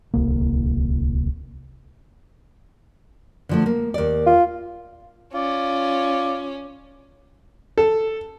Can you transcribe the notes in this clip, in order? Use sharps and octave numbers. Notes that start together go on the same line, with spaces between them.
D1 C2 A#3
D3 F3 A3
A#3
D#2 D5
F4
C#4 F4 D5
A4